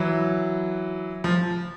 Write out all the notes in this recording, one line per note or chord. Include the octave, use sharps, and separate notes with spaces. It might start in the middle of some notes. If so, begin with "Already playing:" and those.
Already playing: E3 F#3
F3